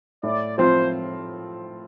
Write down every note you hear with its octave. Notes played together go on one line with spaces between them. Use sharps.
A2 D5
F3 C4 F4 C5